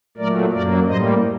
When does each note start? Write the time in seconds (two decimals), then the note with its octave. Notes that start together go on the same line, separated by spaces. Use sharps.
0.17 A#2 F#3 A3 A#4 D5
0.52 F#2 F#3 A#3 A#4 D5
0.86 A2 G3 A#3 C5 D#5